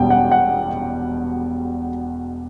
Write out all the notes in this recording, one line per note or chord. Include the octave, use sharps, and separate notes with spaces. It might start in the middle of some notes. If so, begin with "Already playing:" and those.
Already playing: E1 E2 B2 G3 G5
F#5
F#5